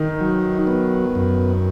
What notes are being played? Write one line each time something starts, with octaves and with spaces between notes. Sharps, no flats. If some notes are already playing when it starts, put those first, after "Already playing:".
Already playing: D#3 D#4
F#3
B3
F#2